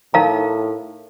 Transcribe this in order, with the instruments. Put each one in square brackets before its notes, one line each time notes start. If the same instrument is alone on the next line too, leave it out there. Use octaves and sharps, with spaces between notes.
[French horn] A2 [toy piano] D#4 A#4 F5 A#5